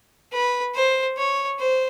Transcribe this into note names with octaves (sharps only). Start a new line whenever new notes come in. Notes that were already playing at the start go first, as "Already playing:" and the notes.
B4
C5
C#5
C5